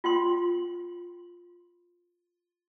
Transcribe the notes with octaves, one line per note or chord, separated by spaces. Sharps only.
F4 G5 C6